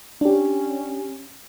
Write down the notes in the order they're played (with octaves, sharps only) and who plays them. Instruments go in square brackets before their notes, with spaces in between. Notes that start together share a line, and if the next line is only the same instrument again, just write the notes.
[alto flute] C#4 [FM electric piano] D4 G4